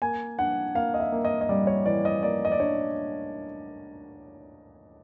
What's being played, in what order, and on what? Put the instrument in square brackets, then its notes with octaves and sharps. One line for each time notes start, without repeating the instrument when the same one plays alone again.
[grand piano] A#3 G#5
D4 F#5
A#3 F5
D#5
E5
A#3
D#5
D#5
G3 D5
C#5
E3 D5
D#5
A#3 D5
D#5
D5
D4 C#5